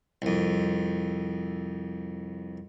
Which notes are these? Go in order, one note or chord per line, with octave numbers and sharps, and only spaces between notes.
C2 F2